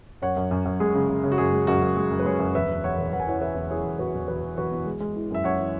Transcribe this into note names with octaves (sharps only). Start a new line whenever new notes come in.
F#2 C#5 F#5
F#2
F#2
F#2
G#3 G#4
C#3
C#3
C#3
F#4
F#2 G#4
G#3
F#2 F#4
F#2
G#3 G#4
F#2
B4
G#3 G#4 C#5
F#2
E1 B4 E5
E1
E1 C#5 F#5
E1
E1 F#5
G#5
E3 C#5 F#5
E3 B4 E5
E2
E3 G#4 C#5
E1
E1 F#4 B4
E1
E1 F#4 B4
E1
E1 F#4 B4
E2
G#3
G#3
E3
F#2 E5
F#2 C#5 F#5
E3